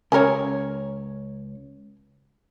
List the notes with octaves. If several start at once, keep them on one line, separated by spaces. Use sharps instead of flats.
C#2 C#4 G4 A#4 C#5